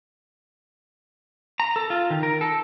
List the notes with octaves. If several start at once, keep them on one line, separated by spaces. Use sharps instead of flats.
A#5
A4
F4
D#3
A#4
A4